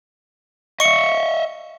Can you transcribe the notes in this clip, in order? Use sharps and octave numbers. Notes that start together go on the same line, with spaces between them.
D#5 E5 C#6 C#7